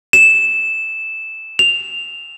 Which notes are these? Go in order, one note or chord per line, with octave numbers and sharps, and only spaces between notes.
E7
F7